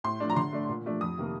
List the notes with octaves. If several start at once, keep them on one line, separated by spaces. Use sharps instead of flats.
A2 C6
F3 A3 D4
A#5
D3 C6
A3 D4
A#2
F3 A3 D4
F2 D#6
C3 D#3 A#3